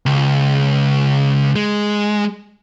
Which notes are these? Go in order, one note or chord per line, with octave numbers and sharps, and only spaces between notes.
C#2
G#3